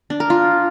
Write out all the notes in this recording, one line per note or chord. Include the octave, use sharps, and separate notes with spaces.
D4
A#4
F4